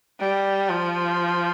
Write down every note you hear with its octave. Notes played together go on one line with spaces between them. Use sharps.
G3
F3